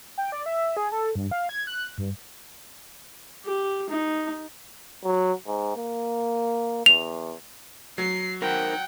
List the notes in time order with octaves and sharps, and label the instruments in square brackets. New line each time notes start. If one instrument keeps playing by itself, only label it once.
[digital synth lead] G5
D5
E5
G#4
A4
G2
F5
G#6
F#6
G2
[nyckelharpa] G4
D#4
[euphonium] F#3
G#2
A#3
[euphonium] E2 [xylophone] F7
[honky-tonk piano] F#3 [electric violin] C7
[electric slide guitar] D#4 A#4 C5 [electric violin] F#5 G5